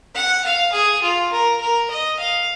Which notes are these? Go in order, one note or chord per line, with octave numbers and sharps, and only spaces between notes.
F#5
F5
G#4
F4
A#4
A#4
D#5
F5